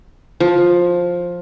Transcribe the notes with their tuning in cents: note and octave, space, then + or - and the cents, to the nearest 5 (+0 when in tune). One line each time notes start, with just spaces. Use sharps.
F3 +10